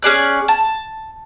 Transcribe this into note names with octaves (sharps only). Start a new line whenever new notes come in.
C#4 G#4 D5 F#6
A5